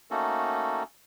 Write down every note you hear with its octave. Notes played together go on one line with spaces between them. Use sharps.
A3 A#3 C#4 D#4 F#4 A4